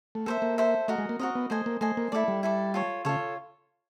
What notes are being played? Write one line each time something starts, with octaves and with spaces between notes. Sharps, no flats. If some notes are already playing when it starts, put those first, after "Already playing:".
A3
A#3 A4 C5 E5
A#3
A4 C5 E5
A3 F#4 A#4 D#5
G#3
A#3
C4 F#4 A#4 D#5
B3
A3 C5 D#5 G#5
A#3
A3 C5 D#5 G#5
A#3
A3 E4 A4 D5
G3
E4 A4 D5
F4 A4 C#5
C#3 F4 A4 C#5